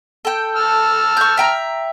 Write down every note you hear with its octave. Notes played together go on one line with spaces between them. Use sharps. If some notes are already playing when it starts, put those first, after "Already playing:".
A4 G5
A5 E6 F6
C#6 G6
E5 G5 A#5